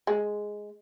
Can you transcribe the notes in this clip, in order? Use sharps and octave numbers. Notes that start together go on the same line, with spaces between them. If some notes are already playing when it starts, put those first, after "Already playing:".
G#3